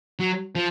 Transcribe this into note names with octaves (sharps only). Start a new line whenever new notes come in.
F#3
F3